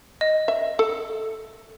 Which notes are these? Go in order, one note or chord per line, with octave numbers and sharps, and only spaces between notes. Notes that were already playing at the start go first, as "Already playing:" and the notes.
D#5
E5
A4